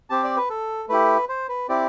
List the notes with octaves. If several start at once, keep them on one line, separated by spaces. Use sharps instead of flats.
C4 G4 A5
D5
B4
A4
A3 E4 G4 B4
C5
B4
C4 E4 G4 D5